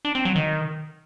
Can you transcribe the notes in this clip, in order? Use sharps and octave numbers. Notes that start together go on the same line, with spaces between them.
D4
C4
F#3
D#3